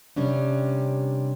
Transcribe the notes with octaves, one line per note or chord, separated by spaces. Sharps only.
C3 G3 C#4 D4